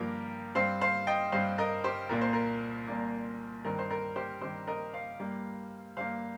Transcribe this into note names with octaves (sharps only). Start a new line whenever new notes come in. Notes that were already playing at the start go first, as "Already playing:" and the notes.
Already playing: G2 F3 A#3 G4 A#4
G2 G3 C4 C5 F5
C5 F5
D#5 G5
G2 G3 C4 C5 F5
A#4 D#5
G4 C5
C2 A#2 A#3 A#4
C5
A#4
C2 A#2 A#3
G2 D#3 C4 A#4
C5
A#4
G4 C5
G2 D#3 C4 G4 C5
A#4 D#5
C5 F5
G2 G3 A#3
G2 G3 A#3 C5 F5